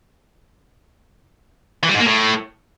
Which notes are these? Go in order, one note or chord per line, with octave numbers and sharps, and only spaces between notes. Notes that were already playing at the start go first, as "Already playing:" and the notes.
E3
G3
G#2
A#3
A2